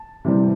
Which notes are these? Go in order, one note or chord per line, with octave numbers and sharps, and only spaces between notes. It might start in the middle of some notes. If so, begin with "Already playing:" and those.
Already playing: A5
C3 E3 G3 C4